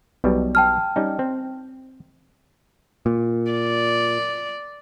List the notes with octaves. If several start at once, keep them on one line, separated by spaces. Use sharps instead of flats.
B1 B2 G3
G5 A5 F6
G3 C#4 D#4
C4
A#2
D5